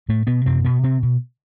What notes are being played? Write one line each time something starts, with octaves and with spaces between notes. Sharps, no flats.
A2 A3
B2 B3
F#2 C3 C4
B2 B3
C3 C4
B2